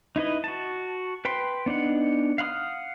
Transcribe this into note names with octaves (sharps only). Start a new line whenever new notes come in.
D#4 E4 B4 D#5
F#4 A5
B4 G5 B5 C6
B3 D4 D#4 F#5
F5 F#5 B5 D#6 F6